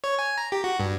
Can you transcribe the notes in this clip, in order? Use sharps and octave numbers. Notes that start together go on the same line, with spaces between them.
C#5
G#5
A#5
G4
F#4
G2